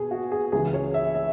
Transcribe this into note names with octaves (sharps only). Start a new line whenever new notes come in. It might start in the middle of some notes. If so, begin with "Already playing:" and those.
Already playing: B2 G#4
F#4
G#4
C#2 C#3 E3 G#4
C#5
E5
E5